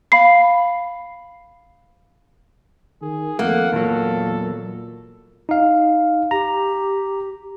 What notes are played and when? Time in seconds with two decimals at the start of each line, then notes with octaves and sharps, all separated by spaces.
0.12 F5 B5 C7
3.02 D#3 G#4
3.39 F2 A3 A#3 F#5
3.73 E2 A#2 F#3 A4
5.49 D#4 F5
6.31 G4 A#5